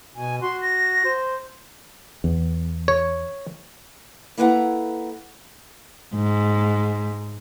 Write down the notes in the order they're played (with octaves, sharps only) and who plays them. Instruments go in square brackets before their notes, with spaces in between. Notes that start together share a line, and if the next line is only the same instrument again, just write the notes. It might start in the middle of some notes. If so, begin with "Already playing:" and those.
[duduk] B2 [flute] G#5
[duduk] F#4 [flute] C6
[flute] A#6
[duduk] C5
[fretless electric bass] E2
[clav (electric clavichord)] C#5
[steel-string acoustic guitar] A#3 E4 A4 B4 F#5 A#5
[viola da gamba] G#2